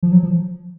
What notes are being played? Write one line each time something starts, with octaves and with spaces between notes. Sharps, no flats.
F3
F#3
F3